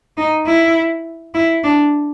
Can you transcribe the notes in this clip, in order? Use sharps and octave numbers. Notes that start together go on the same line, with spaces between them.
D#4
E4
E4
D4